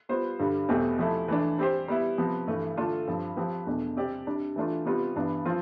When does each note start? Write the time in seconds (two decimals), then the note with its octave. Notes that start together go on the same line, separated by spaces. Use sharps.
0.09 G3 B3 F4 C5
0.39 G2 D3 G3
0.69 E2 B2 A3 C4 G4
0.98 C3 F3 A3 E4 A4
1.28 E3 A3 D4
1.58 G3 C4 G4 C5
1.88 G3 B3 E4
2.18 C3 F3 B3
2.47 G2 E3 A3 E4
2.77 D3 A3 D4 F4 A4
3.07 G2 F3 C4
3.37 F3 C4 G4 B4
3.66 E2 B2 A3 D4
3.96 C3 G3 C4 G4 D5
4.27 C3 G3 D4
4.56 E3 A3 D4 F4
4.85 C3 G3 B3 F4
5.16 G2 E3 B3 D4
5.45 F3 C4 F4